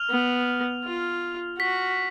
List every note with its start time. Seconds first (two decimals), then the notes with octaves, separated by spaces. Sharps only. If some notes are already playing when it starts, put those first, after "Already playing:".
Already playing: F6 F7
0.10 B3
0.84 F4
1.59 F#4 B6